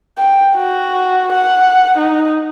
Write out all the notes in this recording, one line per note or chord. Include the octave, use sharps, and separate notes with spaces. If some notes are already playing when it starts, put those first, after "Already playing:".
G5
F#4
F#5
D#4